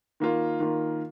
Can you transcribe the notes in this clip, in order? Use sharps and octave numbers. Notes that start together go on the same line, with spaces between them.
D#3 A#3 F4
D#3 A#3 F4